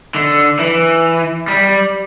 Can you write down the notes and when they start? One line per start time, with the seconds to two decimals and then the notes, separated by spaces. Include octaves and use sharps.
0.15 D3
0.59 E3
1.48 G3